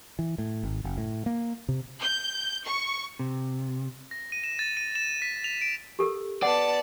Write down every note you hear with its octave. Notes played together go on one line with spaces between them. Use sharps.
E3
A2
G#1
F#1
A2
A#3
C3
G6
C#6
C3
A#6
D#7
E7
A6
D#7
E7
B6
F7
D7
G4 A4 A#4
B3 D5 F#5 A5